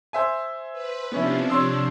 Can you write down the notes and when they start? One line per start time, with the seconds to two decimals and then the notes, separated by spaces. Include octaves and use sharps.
0.13 C5 E5 G#5
0.72 B4
1.12 C3 F3 B3 C#4 D4 E4
1.50 C#5 C6 E6